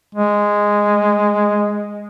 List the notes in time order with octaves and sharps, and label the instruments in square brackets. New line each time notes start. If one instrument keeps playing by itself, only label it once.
[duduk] G#3